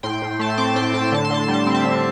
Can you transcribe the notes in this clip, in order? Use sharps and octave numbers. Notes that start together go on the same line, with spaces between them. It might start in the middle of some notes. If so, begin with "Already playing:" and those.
A2 G5 C6
A2
A3 A5
C6
C4 A5 D6
A2 G5 C6
A2 A5
C6
D3 A5
C6
D3 A5
G3 C6
A5
C4 C6
E5 A5
D3